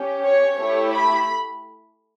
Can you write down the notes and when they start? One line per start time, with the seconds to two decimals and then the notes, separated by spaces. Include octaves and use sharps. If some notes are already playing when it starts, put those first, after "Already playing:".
Already playing: C#4 G4
0.24 C#5
0.59 A3 E4 G4 C#5
0.93 B5